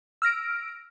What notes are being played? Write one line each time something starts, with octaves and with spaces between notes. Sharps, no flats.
E6 F6 A#6 D7